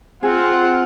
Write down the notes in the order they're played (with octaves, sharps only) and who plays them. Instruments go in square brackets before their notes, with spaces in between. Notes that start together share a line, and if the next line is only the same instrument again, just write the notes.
[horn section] C4 [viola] F4 [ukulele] G#4 [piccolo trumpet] F#5